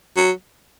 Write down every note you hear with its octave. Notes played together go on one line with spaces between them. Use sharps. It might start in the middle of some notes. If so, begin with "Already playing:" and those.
F#3